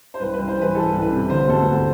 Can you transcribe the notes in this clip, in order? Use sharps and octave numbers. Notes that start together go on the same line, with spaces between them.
C5
C2 B4
B4
C2
C5
E3 B4
E3 A4
C2
B4
C3
D3 C5
D2 A4
D2 B4
C5